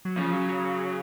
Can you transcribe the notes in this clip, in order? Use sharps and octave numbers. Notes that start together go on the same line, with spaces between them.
F#3
C#3 F3
F#3
F#3
F#3
F#3